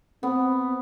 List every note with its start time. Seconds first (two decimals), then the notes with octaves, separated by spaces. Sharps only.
0.23 B3 C4